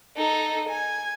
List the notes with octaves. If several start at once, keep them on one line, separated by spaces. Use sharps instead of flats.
D#4 A4
G#5 G#6